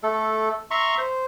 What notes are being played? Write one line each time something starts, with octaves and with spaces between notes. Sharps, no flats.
A3 A4
E5 A#5 C6 C#6
C5